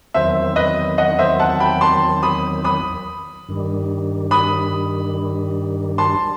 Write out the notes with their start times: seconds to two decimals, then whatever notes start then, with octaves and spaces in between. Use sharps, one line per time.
0.14 E2 D#3 F#3 C4 C5 E5
0.56 B4 D#5
0.98 D#5 F#5
1.19 C5 E5
1.39 F#5 A5
1.60 G5 B5
1.81 A5 C6
2.23 B5 D#6
2.64 B5 D#6
3.48 G2 D#3 G3
4.31 B5 D#6
5.98 A5 C6